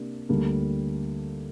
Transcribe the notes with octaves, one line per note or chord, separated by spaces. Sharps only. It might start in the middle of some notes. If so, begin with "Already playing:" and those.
Already playing: C3 A#3 D4 G4
D2 D3 G3 A#3